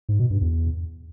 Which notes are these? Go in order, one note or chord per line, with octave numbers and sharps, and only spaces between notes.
G#2
B2
G2
E2